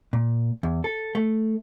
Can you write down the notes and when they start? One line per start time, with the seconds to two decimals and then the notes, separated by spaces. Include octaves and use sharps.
0.13 A#2
0.63 E2
0.84 A4
1.15 A3